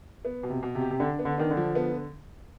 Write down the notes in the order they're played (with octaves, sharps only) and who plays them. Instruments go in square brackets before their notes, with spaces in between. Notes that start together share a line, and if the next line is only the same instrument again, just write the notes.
[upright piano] B3
B2
[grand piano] C3
[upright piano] B2
[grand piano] C3
[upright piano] G4
[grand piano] C3
[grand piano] D3 [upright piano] D4
[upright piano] B3
[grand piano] D3
[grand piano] D#3 [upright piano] D4
[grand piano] D3
[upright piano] F3
B3